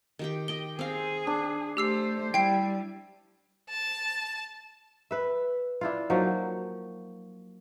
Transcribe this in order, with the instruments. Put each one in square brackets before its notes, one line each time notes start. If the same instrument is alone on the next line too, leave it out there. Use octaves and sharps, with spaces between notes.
[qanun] D#3 G4 G5
[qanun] G4 D#5 G5 [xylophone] G7
[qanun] C4 F5 [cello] G#4
[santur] D4
[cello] A3 C5 [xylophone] G4 E6 C7
[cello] G3 [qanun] E4 [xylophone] G5 C7
[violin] A5
[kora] B4 E5
D4 E4 F4
F3 F#3 A#3 D#4